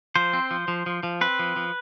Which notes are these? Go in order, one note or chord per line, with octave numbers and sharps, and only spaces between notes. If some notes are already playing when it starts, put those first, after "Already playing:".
F3 C5
C4
F3
F3
F3
F3
C4 B4
F3
F3